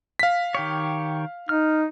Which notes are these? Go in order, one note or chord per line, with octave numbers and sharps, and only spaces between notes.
F5 B6
D#3 G4 C#5
D#4 F6